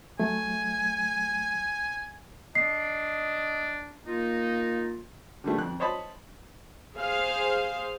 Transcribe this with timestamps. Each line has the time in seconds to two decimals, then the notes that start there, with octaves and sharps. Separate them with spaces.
0.20 F#3 A3 G#5
2.55 D4 D#5 C7
4.06 A#3 D#4 F4
5.44 D3 G3 A3
5.57 F2 F#6
5.80 C5 C#5 D#5 A5 B5
6.96 G#4 C5 F5